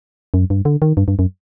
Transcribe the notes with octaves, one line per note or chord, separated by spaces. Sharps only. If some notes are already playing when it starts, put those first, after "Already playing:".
F#2
G2
D3
D#3
G2
G2
F#2